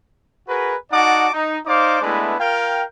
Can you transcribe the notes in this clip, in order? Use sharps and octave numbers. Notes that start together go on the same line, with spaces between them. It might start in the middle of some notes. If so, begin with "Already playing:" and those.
F#4 G#4 A#4 B4
D#4 F#4 D5 F#5 A5 D6
D#4
D#4 C5 D5 F5 D6
G#3 A3 B3 D4 E4 B4
F4 A#4 F5 G5